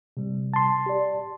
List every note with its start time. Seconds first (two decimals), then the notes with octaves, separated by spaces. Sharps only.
0.17 C3 G3
0.54 A5 C6
0.86 G4 D5